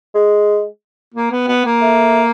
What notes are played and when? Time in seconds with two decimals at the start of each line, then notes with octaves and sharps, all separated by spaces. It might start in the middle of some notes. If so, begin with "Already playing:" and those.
0.14 G#3
1.15 A#3
1.31 B3
1.48 B3
1.65 A#3
1.81 A3